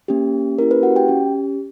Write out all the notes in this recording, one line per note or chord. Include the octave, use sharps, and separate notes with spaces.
A#3 C#4 G4
A#3 C#4 E4 G4 A#4
B4
F#4 F#5
G4 G5
C#4 G4